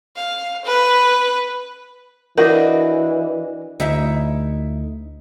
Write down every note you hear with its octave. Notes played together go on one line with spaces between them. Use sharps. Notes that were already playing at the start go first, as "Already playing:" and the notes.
F5
B4
E3 D4 F#4 A#4 D#5
D2 D#4 E4 E5